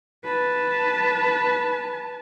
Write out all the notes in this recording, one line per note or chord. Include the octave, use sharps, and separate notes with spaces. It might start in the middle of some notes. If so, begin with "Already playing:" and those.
B4 A5